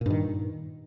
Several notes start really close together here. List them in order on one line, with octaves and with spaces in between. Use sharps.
A#2 G2 D#3